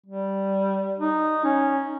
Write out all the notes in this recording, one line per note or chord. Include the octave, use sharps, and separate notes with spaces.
G3
D#4
C#4